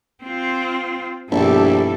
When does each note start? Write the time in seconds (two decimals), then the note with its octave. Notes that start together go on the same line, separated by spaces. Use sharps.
0.24 C4 F4
1.32 A#1 G2 B2 G3 E4 A4